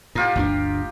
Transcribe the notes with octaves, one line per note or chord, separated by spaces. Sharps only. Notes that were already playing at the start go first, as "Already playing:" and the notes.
A2 D#4 F4 G4
G1 D2 D4